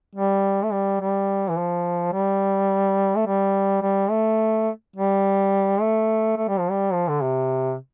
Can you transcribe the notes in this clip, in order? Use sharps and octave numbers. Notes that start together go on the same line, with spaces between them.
G3
A3
G3
G3
E3
F3
G3
A3
G3
G3
A3
G3
A3
A3
G3
F3
G3
F3
D3
C3